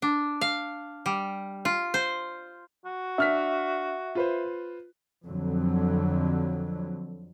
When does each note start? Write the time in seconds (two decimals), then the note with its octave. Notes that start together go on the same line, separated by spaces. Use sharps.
0.02 D4
0.41 F5
1.06 G3
1.65 F4
1.94 C5
2.85 F#4
3.18 D4 E5 F6 B6
4.15 F4 B4 C5
5.26 F2 D3 F#3